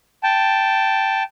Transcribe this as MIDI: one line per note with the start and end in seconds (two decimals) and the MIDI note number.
0.23 1.23 79
0.23 1.23 81